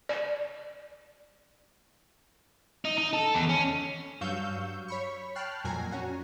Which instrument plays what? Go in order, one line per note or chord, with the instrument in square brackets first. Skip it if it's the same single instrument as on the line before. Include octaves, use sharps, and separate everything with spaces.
[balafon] D5
[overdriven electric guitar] D#4
D#4
A4
E2
C#4
[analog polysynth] G2 F#3 F5 C#6 E6 G6
C#5 B5 C#6
G5 A5 F6 F#6 C7
F2 A#2 F#3 G#5 A#5
C#4 F#4